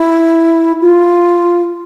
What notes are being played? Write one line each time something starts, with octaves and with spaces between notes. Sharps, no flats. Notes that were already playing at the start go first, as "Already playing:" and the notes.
Already playing: E4
F4